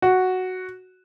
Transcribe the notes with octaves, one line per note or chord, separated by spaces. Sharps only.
F#4